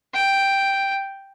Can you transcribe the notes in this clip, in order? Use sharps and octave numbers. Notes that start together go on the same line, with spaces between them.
G5